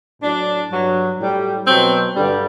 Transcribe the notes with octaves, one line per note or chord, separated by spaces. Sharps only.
A2 F#3 D4
G2 F#3
A2 G3
B2 F#3 C4
G2 D3 G3